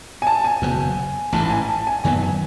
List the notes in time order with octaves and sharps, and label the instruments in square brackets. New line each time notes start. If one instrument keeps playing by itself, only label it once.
[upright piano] G#5
A5
G#5
[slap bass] F#1 E2 B2
[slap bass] A1 G#2 E3 [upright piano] A5
[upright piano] G#5
A5
G#5
[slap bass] F#2 D#3 F#3 B3 [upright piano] G#5
[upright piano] G#5